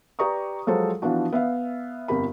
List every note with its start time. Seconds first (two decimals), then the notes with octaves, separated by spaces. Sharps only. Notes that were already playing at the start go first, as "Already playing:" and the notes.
0.19 G4 B4 D5 A#5 C#6 D#6
0.67 F3 F#3 G#3 A4 C5
1.02 E3 F3 B3 D4 F#4
1.32 B3 E5 F5
2.08 G1 F2 G4 A#4 B5